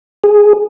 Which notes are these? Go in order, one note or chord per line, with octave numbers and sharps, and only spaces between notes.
G#4